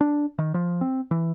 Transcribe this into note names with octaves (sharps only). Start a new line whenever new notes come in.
D4
D#3
F3
C4
E3